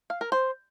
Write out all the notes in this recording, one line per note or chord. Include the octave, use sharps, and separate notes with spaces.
F5
A#4
C5